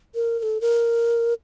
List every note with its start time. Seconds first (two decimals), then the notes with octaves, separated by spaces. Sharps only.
0.15 A#4
0.39 A#4
0.43 A4
0.61 A#4